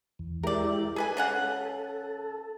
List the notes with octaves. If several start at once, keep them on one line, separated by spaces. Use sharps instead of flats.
E2
G#3 E4 G4 A#4 D5
G#4 A4 B4 G#5
C#3 C#4 F#5